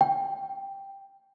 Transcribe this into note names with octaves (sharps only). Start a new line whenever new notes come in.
G5